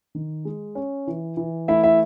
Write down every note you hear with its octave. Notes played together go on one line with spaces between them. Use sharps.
D#3
G#3
C#4
E3
E3
A3 E4 E5
E4 E5